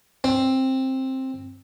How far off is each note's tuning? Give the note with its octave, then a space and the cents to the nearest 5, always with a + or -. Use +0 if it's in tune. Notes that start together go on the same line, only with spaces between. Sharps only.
C4 +10